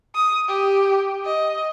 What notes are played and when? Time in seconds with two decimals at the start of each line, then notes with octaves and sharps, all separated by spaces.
0.15 D#6
0.48 G4
1.25 D#5